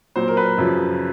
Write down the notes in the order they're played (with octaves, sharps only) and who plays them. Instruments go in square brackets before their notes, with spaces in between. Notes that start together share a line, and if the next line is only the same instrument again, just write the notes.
[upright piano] A#2 F#3 C5
A#4
B4
F#2 C#3 F3